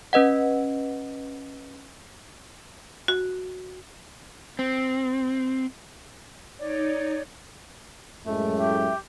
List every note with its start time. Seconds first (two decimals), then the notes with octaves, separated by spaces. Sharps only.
0.13 C#4 B4 D#5 F#5
3.08 F#4
4.59 C4
6.59 D#4 C#5 D5
8.26 F#2 A2 G#3 A3
8.57 G4 E5